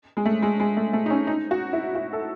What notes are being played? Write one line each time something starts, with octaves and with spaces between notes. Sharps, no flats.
G#3
A3
G#3
G#3
A3
A3
D#4
C#4
D#4
F#4
E4
F#4
A4